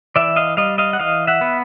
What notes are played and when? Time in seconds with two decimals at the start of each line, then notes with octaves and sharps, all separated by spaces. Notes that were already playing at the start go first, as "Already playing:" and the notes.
0.16 E3 D5 E5
0.36 D#5 F5
0.57 G3 D#5 F5
0.78 D#5 F5
0.93 F#5
1.00 E3 D#5 F5
1.27 E5 F#5
1.41 B3